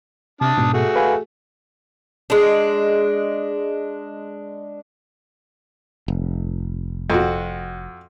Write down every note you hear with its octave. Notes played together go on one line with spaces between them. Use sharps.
C3 D4 A5 D#6
G#2 B2
A3 F#4 G#4
B4 F5 G#5
G#3 D4
F1
F2 F#4